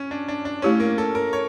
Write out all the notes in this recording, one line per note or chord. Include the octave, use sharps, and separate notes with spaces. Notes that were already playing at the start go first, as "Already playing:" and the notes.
Already playing: C#4
D4
D4
D4
A3 C#4 E4 G4 C#5
A#3
A4
A#4
C#5